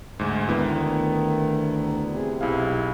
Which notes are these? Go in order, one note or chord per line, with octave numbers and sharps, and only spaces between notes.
D2 G#2
D2 D#3 B3 E4
C3 G#4
B1 E4 G#4 F5